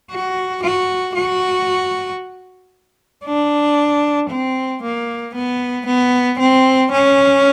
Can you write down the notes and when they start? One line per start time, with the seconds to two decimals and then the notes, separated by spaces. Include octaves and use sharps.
0.12 F#4
0.63 F#4
1.16 F#4
3.25 D4
4.30 C4
4.82 A#3
5.35 B3
5.87 B3
6.39 C4
6.91 C#4